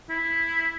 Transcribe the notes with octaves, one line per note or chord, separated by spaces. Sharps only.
E4